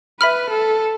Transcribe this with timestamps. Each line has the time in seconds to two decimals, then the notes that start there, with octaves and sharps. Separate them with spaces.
0.20 B4 E5 B5 F6
0.50 A4